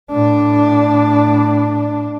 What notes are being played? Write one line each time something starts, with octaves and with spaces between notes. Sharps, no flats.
A2 D4